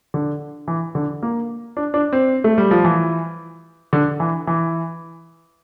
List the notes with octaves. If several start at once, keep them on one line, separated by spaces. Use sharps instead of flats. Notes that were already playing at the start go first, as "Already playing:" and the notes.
D3
E3
D3
A#3
D4
D4
C4
A3
G3
F3
E3
D3
E3
E3